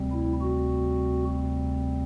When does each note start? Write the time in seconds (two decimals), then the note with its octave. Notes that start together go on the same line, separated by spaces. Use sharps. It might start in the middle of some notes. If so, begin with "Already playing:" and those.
Already playing: D2 C3 G3 C4
0.12 E4
0.41 F#4